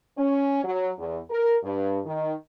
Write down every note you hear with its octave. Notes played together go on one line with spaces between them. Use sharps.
C#4
F#3
E2
A#4
G2
D#3